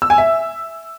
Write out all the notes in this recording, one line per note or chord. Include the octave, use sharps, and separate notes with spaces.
E6
G#5
E5